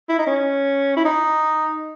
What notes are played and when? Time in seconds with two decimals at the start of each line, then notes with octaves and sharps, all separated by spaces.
0.09 E4
0.19 D#4
0.27 C#4
0.97 E4
1.05 D#4